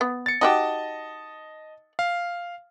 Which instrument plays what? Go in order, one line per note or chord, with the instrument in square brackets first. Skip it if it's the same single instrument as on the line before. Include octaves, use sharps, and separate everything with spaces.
[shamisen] B3
[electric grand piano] A6 C#7
[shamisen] D#4 F#4 G4 [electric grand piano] D#5 A5
[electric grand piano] F5